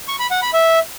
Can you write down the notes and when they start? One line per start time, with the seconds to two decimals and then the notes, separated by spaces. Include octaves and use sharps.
0.08 C#6
0.20 B5
0.31 F#5
0.42 B5
0.54 E5